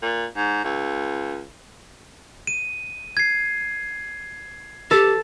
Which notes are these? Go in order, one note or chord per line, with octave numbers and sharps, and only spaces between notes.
A#2
G#2
C#2
D#7
G#6 C7
G4 A4